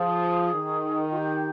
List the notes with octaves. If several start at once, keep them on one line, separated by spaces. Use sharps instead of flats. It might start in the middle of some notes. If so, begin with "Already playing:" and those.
Already playing: F3 G#4
D#3
F4
G4